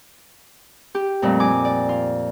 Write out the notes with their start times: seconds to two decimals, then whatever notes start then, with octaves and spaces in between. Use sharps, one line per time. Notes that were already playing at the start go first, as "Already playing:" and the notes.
0.95 G4
1.22 F2 A#2 G3 A3
1.40 G#5 D6
1.65 D5
1.89 F4